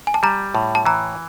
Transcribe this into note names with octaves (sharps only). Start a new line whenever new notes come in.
G#5
A5
G3 A#5
A2
A5
E3 A#5